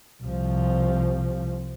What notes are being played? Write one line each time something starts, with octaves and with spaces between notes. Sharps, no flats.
C2 F3